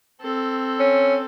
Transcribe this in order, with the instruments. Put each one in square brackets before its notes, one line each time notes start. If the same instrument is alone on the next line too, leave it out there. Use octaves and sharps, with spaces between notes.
[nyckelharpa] C4 A4
[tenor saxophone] C#4